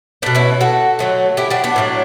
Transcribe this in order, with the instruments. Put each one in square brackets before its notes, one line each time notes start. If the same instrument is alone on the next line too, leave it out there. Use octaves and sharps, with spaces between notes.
[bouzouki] B2 A3 B3 D4
C#4 E4
F#4 A4
D3 F#3 A3
E4 G4
D4 F#4
B3 D4
A2 F#3 A3